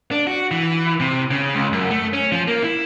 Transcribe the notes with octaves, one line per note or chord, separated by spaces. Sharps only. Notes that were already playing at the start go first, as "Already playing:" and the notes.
D4
F#4
E3
C3
C#3
C#2
F#2
A3
C#4
F3
A#3
E4